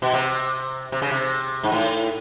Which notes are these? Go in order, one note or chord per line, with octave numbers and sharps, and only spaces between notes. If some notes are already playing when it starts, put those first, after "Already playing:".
B2
C3
C3
C#3
C3
G#2
A2